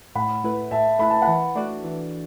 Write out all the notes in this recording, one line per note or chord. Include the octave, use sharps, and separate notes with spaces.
A2 F#5 B5
A3 E4 B4
A2 E5 A5
A3 E4 B4 B5
A5
F#5 B5
E3
A3 D4 F#4 D5
E3